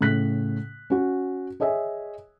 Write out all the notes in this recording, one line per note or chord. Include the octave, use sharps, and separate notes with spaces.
A2 C#3 F#6 B6
C#4 F#4
G#4 C#5 D#5 E5 G#5